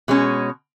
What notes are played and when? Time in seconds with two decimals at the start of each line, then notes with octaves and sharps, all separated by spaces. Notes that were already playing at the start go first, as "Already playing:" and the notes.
0.08 B2 G#3 C#4